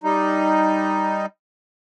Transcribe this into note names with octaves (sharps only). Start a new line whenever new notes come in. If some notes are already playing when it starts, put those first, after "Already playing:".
G3 D#4